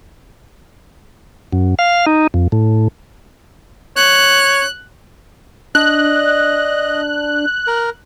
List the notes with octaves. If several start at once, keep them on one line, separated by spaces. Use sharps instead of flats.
F#2
F5
D#4
F2
A2
C#5 F#6
D4 D#5 F#6
A#4